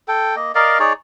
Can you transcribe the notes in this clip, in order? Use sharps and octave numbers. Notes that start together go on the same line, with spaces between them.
A4 G5
A#3 D#5
A#4 D5 D#5 F5
D#4 G#4 C#5 D5